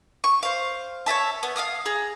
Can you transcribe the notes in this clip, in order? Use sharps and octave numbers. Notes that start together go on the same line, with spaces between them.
C#6
C5 F5
C#5 D#5 E5 A5
B3
F5 F#5 D#6 F6
G#4 A#5